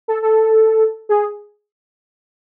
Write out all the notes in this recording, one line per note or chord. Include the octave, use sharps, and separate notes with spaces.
A4
A4
G#4